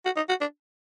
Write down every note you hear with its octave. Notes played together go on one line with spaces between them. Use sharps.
F#4
D#4
F#4
D4